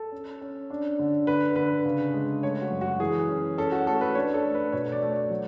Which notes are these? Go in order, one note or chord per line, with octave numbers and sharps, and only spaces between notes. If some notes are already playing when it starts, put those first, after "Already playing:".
Already playing: A4
C#4
C#4
D4
D3
D3 B4
D3 B4
C#3
G#3
A3 C#5
F#4
F#2
F#4
E3 G#4
C#4
C#4 A4
F#4
A3 A4
B4
D4 C#5
A4
A3
B4
B2 C#5
D5
A3
C#5
F#3